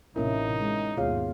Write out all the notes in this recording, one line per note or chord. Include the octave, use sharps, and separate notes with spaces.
A1 C3 A#3 C#4 D#4 E4 A#4
G#3
D#2 G#2 B2 F4 G#4 C#5 F5